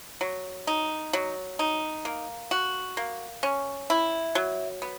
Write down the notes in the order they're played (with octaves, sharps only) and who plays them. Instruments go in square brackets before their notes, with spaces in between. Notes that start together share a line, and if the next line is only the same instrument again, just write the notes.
[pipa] F#3
D#4
F#3
D#4
A#3
F#4
A#3
C#4
E4
F#3
B3